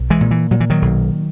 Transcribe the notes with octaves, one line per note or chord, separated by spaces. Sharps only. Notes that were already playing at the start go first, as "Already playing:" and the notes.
Already playing: B1
E3 G#3
A#2
E3
A#2 F#3
E3
D#3 F#3
B1